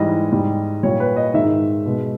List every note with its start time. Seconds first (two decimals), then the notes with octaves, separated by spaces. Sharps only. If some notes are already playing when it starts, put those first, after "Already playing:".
Already playing: G#2 E3 G3 D#5
0.31 G#2 G3
0.83 A#2 G3 C#5
1.00 B4
1.16 D#5
1.34 G#2 D#3 G#3 E5
1.86 B2 G#3